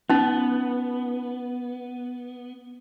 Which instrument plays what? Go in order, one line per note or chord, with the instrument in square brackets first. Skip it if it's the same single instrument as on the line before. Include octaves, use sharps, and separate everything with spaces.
[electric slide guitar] B3 [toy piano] C#4 D#4